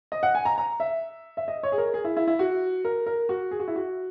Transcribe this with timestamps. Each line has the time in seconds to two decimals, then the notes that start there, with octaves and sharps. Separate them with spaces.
0.12 D#5
0.23 F#5
0.35 G#5
0.45 A#5
0.58 A#5
0.80 E5
1.37 E5
1.48 D#5
1.63 C#5
1.72 G#4
1.78 A#4
1.94 G#4
2.04 E4
2.17 E4
2.27 E4
2.39 F#4
2.85 A#4
3.06 A#4
3.29 F#4
3.51 G#4
3.60 F#4
3.68 E4
3.76 F#4